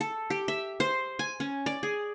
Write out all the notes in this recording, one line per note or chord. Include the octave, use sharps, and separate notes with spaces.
A4
G4
E5
C5
G#5
C#4
D5
G#4